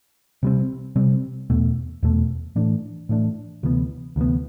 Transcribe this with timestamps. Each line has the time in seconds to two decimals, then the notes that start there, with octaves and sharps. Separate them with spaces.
0.43 C3 G3 C4
0.96 C3 G3 C4
1.50 E2 B2 A3
2.03 E2 B2 A3
2.56 A2 E3 A3 D4
3.09 A2 E3 A3 D4
3.63 D2 C3 E3 B3
4.16 D2 C3 E3 B3